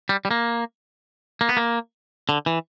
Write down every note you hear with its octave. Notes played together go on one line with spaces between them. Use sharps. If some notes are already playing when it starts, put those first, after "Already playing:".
G3
G3
A#3
A#3
B3
A#3
D3
E3